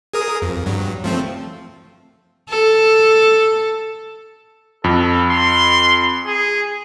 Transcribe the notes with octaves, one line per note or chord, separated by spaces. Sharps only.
G#4 A#4 D#6
F2
G2 F#3
F3 A3 C4
A4
F2 A4
C6
G#4